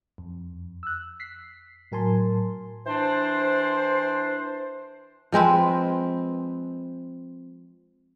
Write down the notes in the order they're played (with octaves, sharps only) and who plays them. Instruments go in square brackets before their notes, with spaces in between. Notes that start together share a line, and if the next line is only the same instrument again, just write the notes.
[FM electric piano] F2
E6 F#6
B6 C7
A2 F#3 A#4 G#5 A5 C6
[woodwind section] E3 D4 C5
[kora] F3 G#3 C4 B4